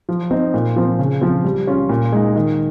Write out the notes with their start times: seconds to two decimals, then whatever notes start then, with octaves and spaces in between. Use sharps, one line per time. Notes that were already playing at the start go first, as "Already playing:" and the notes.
0.09 F3
0.31 C4 D#4
0.54 A#2
0.76 F3 C4
0.99 C#3
1.21 F3 C4
1.45 G3
1.67 C#4 F4
1.89 A#2
2.12 G#3 D#4
2.36 D#3